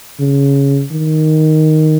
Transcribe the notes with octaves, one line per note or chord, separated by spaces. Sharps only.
C#3
D#3